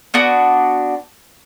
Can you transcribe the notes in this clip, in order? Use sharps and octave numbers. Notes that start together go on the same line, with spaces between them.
B3 D4 F#4